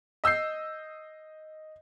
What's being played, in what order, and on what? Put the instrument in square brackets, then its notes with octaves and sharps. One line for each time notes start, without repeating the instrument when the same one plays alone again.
[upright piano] D#5 E6 G6 C7